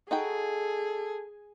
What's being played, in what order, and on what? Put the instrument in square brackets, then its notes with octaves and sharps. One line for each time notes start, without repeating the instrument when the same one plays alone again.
[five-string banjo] D#4 F#4 G5 [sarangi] G#4 [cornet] A4